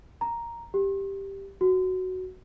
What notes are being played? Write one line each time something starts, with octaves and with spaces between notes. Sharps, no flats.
A#5
G4
F#4